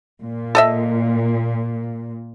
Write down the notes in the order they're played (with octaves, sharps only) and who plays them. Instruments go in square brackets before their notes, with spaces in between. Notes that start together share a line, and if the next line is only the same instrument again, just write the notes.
[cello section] A#2
[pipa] A4 D#5 E5